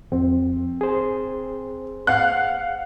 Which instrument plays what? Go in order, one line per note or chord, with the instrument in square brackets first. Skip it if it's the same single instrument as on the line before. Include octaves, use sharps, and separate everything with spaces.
[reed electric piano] F2 [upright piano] C4
[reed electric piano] G#4 C5
[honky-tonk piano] F5 F#5 F#6